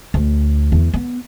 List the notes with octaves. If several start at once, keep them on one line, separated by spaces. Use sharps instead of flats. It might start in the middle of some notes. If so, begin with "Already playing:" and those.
D2
E2
B3